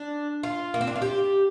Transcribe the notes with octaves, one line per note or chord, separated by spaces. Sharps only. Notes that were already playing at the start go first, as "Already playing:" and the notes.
Already playing: D4
F4
A#3
C4
D4
F4
G4